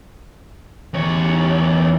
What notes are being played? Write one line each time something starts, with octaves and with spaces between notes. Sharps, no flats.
E2 C#5